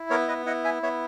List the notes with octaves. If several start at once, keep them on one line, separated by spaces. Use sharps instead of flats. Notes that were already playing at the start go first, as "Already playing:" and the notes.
Already playing: E4
B3 A#4 C#5
B4 D#5
E4 D#5 F#5
E5 G#5
B3 C#5 E5